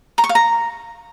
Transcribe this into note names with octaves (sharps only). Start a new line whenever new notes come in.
A#5
C#6
F5
A#5